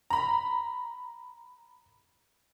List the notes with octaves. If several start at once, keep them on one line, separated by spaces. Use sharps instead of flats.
A#5 B5